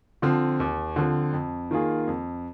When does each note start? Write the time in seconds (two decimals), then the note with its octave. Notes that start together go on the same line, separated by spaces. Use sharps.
0.22 D3 F3 C4
0.60 D#2
0.96 D3 F3 C4
1.33 F2
1.71 D#3 A#3 F4 G#4
2.07 F2